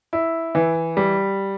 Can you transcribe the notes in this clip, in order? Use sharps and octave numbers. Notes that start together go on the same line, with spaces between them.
E4
E3
G3